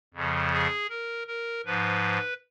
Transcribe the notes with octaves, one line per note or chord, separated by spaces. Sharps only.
F2 C#3 F3
G#4
A#4
A#4
G#2 F3 B4